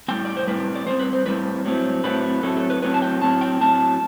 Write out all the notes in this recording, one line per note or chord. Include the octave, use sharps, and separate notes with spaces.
A2 G3 C4 G5
D5
C5
A2 G3 C4 B4
D5
A2 G3 C4 C5
B4
C5
A2 G3 C4 B4
A2 F#3 A3 C4
A2 F#3 A3 C4 B4
A2 F#3 A3 C4 A4
A4
B4
A2 F#3 A3 C4 B4
A5
G5
A2 F#3 C4 A5
G5
A2 F#3 C4 A5